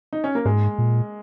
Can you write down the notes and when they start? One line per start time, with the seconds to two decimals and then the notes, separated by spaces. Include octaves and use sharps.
0.13 D#4
0.24 C#4
0.35 A#3
0.45 G#2 G#3
0.78 A#2